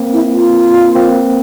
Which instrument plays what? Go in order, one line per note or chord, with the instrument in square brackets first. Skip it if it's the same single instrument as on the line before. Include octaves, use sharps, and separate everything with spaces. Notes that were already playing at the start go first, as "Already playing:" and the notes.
Already playing: [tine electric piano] A#3 C4
[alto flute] E4
F4
[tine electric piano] A#3 C4